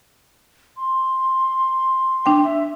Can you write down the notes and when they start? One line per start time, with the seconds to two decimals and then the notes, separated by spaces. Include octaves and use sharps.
0.77 C6
2.26 D4 G5
2.44 E5